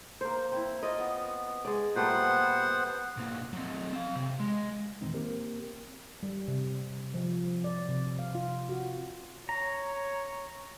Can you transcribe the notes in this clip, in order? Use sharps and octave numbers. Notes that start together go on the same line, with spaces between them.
A#3 C5
C4 E4
F4 D5 D#5
B3
G#3 D5
A#2 G3 A3 B3 C5 F#5
B1 A#3
F#3 C4
C4 F5
C3
G#3
E2 A#2 D#3 E3 C4 D#4
A#3 C4 G4 A#4
G3
C3
F3
D5
C3
F5
F4
F#4
C#5 A#5